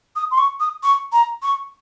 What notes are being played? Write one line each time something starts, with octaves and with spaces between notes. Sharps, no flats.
D#6
C6
C#6
D#6
C#6
A#5
C#6